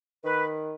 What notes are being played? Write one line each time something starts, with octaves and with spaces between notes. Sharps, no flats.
D#3 B4